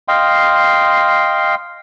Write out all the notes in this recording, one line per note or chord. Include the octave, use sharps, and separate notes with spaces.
D#5 F5 G5 C6